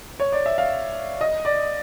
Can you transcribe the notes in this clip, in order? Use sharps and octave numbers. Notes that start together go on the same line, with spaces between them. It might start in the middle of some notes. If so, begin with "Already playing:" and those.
C#5
D5
E5
F5
D#5
D5